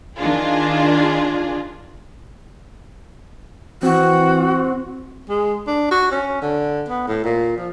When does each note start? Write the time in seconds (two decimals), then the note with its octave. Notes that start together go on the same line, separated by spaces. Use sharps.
0.18 D#3 D4 F4 G#4
3.83 E3 C4 F#4
5.29 G#3
5.67 D4
5.91 F#4
6.11 C#4
6.42 D3
6.89 B3
7.08 A2
7.24 A#2
7.57 F3